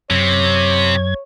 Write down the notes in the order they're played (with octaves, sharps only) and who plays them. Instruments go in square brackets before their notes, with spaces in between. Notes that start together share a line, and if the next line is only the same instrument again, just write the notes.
[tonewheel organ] F#2 G#6 [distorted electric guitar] C3 [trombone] C#5